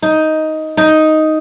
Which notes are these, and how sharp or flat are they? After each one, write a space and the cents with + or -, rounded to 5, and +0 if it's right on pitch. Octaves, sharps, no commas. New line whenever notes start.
D#4 +10
D#4 +5